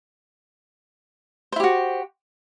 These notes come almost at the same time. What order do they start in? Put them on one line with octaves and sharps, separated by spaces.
C5 E4 G4 F#4